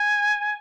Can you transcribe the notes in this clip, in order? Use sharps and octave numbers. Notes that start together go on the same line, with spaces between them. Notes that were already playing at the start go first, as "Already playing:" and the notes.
Already playing: G#5